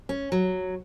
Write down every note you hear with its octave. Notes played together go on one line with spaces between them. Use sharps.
C#4
F#3